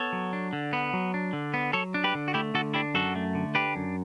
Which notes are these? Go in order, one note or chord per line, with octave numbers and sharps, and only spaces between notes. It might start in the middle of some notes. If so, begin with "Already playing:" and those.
Already playing: B3 A4 C#5
F#3
D4
D3
B3
F#3
D4
D3
B3
F#3 A4 C#5
D4
G4 B4
D3
F#4
A3 E4 G4
D3 F#4 A4
D4 E4 G4
F#2 F#4 A4
A3
D3
D4 G4 B4
F#2